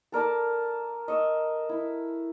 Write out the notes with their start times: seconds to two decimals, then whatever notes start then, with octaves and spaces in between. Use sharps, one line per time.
0.12 A4 A#4 D5 A5
1.08 D#5 C#6 E6
1.69 E4